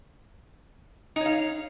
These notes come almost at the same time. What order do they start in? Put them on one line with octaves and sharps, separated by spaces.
D#4 C#5 F5